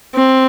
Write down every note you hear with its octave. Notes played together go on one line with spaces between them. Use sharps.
C4